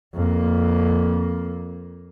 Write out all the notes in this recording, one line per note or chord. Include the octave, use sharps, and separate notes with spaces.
F2 A#3